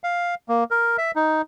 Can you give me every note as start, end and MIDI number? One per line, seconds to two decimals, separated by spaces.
0.04 0.35 77
0.49 0.64 58
0.71 0.97 70
0.98 1.11 76
1.16 1.42 63